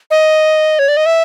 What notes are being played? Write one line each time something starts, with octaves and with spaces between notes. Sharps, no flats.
D#5
C#5
D5
D#5
E5